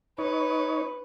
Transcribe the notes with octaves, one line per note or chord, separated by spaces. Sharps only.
D#4 B4 C#5